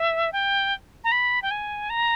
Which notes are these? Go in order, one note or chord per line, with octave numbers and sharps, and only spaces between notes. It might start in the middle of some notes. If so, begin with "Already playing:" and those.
Already playing: E5
G5
A#5
B5
G5
G#5
A#5